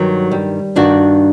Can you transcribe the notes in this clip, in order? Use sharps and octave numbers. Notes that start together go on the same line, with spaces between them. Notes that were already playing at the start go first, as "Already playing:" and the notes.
Already playing: G2 D#3 F#3
G3
G2 D#3 D4 F#4